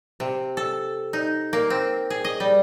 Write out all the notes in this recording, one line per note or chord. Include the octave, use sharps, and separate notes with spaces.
C3
A4
D#4
A#3
C4
G#4
D#5
G3